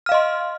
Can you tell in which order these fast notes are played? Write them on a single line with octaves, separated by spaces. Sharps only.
F6 F5 D#5 C6